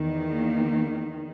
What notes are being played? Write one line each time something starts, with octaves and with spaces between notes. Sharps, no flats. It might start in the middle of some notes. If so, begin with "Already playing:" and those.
Already playing: E2 D#3
A#3